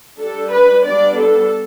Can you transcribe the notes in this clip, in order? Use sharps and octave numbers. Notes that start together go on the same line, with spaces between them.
G3 D4 A4
B4
G3 B3 D4 D5
A4